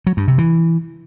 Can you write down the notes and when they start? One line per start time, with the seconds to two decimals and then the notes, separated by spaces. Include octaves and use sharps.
0.07 F#3
0.17 G2
0.28 C3
0.38 E3